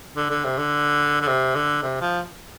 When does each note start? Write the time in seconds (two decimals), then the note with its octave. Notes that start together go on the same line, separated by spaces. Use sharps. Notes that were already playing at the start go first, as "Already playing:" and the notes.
0.16 D3
0.30 D3
0.44 C3
0.58 D3
1.21 D3
1.27 C3
1.55 D3
1.83 C3
2.01 F3